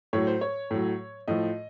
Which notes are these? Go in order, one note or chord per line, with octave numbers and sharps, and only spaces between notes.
A2 F#3 C#5
C5
C#5
A2 F#3
A2 F3 D#5